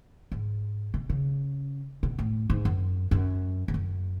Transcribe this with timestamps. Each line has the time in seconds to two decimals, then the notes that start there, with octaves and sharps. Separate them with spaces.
0.32 G#2
0.94 B2
1.10 C#3
2.03 B2
2.19 A2
2.50 G#2
2.65 F#2
3.11 F#2
3.68 G#2
3.74 F#2